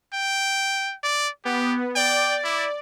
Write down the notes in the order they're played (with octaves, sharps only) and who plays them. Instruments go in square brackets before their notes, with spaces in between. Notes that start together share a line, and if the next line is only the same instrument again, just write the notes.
[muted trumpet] G5
D5
[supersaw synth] B3 [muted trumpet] G4
[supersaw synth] D5 [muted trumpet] G5
[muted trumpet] E4